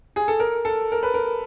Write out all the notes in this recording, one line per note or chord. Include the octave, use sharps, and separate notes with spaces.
G#4
A4
A#4
A4
A#4
B4
A#4